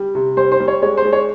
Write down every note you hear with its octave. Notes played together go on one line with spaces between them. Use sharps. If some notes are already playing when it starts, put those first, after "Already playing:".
Already playing: G3
C3
G3 C5
C5
G3
C#5
G#3 C#5
C5
G#3
C#5